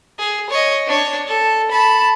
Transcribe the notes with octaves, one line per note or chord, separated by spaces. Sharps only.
G#4
C#5 D#5
D4 C#5
A4
A5 B5